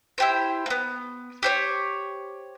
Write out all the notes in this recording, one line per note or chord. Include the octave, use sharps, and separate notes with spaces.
E4 G4 C5
A#3 B3
G4 C5 C#5